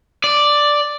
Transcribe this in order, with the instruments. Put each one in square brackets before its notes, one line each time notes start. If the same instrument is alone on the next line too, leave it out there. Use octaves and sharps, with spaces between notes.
[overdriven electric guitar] D5